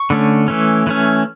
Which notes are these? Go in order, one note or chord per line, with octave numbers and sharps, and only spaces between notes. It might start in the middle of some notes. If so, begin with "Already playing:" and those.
Already playing: C#6
D3 A3 C#4
E3 A3 C#4
E3 A3 C#4